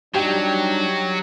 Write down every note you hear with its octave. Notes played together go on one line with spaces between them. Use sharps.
F#3 G3 D4 D#4 G4